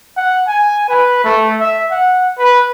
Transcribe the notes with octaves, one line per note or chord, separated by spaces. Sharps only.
F#5
G#5
B4
A3
E5
F#5
B4